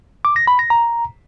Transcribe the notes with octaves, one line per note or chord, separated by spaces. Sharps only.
D6
A#6
B5
A#6
A#5